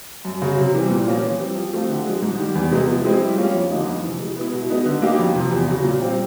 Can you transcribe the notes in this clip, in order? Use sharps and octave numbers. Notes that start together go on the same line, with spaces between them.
F#2
C#3 F#3
C3
E3 G3 C4
A#2
F3 A#3 C#4 F4
E3
G3 C4
F3
A3 C4 F4
D3
F3 G#3
G#2
D#3 G3
E2
C3 E3 G#3 B3
F3
G#3 C4 E4
G3
A#3 C#4 F4
F2
D3 F3 A#3 D#4
F2
C3 E3
G#3
B3 E4
B2
G#3 B3 D#4
D3
F#3 A#3 D#4 G4
F2
C3 F3
E2
C#3 F#3
A#2
G3 C4 F4